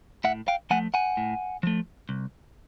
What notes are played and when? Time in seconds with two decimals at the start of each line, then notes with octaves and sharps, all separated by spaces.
0.24 A2 E5 F#5
0.48 F5 G5
0.70 F3 A3 F#5 G#5
0.94 F#5 G#5
1.17 A2
1.63 F3 A3
2.09 C2